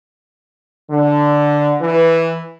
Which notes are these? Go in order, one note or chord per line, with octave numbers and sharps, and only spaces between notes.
D3
E3